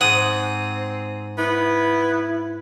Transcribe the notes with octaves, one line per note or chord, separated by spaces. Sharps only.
G#2 C4 F#5 D#6
B3 E4